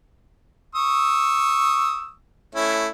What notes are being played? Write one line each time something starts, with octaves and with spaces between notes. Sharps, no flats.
C#6 D#6 E6
A3 C#4 E4